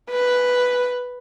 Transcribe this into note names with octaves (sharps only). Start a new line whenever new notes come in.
B4